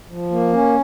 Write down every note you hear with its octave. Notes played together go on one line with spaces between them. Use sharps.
F3
A#3
C#4